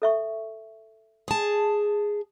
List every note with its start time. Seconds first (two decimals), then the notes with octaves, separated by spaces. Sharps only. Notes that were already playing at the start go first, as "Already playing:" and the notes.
0.02 A4 E5 C#6
1.28 G#4 A5